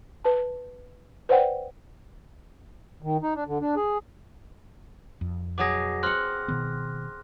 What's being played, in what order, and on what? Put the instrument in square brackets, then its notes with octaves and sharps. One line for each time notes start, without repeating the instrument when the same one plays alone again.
[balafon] B4 A5
B4 C5 D5 F#5 G5
[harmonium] D#3
D#4
D4
D3
D4
G#4
[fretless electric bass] F2
[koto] B2 F#3 G#4 [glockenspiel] D6 A#6
[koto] C4 F#5 [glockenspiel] C6 F6 F#6
[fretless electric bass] B2 D#3 B3